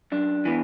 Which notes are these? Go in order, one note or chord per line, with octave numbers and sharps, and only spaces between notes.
F#2 D4
E3 B3